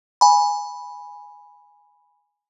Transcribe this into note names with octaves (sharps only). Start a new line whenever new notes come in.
G#5 B5